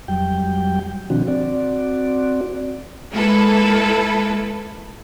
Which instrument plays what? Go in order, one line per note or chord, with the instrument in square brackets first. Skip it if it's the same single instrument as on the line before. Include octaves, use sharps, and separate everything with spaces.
[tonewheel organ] F2 F#3 G3 G5
B2 D#3 F3 C4 D4 F#4
C4 F#4 D5
[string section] G#3 A#3 E4 A4 B4